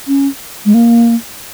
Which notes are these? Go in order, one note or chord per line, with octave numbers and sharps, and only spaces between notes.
C#4
G#3
A#3